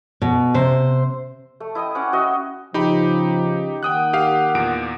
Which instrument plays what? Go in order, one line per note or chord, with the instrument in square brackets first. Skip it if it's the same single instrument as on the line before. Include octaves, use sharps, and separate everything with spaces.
[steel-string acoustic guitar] B2
C3 C5
[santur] A3
E4 D#5 G5 D#6
C#4 F#5 D6
F#4 D#5 E5
[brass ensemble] C#3 F3 [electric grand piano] D#4 G4 B5
[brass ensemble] D#3 A#3 F#5 [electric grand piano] G5 D#6 F#6
[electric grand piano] G4 F5
E2 A#2 D7